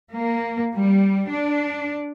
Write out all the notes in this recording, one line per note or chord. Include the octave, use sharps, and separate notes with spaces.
A#3
G3
D4